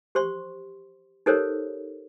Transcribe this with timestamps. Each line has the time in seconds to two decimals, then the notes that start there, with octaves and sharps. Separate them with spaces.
0.15 G4 C5 C6 C#6
1.26 D#4 G4 A4 A#4 C5 C#5